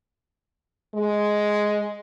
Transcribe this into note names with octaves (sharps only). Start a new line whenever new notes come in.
G#3